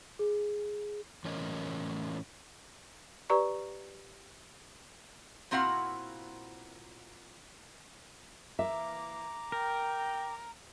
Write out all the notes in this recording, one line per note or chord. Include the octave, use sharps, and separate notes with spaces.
G#4
A2 E3 C#4 A#4 D#5
G4 B4 D5 A#5 C#6
A#2 C4 E4 F#4 F5 F#5
E3 A#3 E5 A#5 D6
A#4 G5